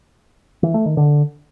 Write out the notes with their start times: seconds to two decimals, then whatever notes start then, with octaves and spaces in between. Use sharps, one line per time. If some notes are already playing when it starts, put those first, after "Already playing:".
0.63 E3
0.74 A3
0.86 D#3
0.97 D3